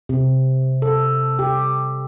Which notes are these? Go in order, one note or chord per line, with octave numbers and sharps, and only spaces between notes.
C3
A4
G4